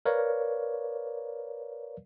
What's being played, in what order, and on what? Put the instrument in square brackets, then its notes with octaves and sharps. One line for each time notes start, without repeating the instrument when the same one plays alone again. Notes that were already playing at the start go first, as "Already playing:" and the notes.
[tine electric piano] A#4 B4 C#5 D5 F5